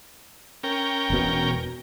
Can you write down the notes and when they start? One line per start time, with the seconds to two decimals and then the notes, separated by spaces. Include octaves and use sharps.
0.63 C#4 A#4 G5
1.10 E1 B2